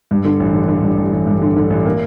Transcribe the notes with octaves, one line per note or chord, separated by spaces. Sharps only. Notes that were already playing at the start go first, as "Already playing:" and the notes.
G2
D3
A1
D3
D3
G2
A1
A1
G2
D3
D3
A1
A#3